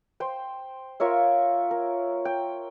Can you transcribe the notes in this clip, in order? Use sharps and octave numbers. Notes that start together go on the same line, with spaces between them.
C5 G5
F4 A#4 C#5 E5
A#4
G5